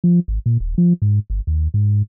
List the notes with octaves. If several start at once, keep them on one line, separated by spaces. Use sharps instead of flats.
F3
G#1
A#2
D#1
F3
G#2
G1
D#2
G#2